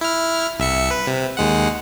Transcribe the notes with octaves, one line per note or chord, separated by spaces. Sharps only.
E4 F6
C2 E5 C#7
B4
C3
D#2 G#3 F#5